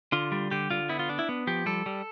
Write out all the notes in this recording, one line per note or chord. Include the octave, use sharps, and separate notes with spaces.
D3 F4
G3
D3 G4
D3 F4
B3 E4
F4
D4
E4
B3
F3 G4
G3 A4
G3